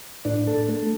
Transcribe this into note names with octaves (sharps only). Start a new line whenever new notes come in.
A2 D4
A4
A3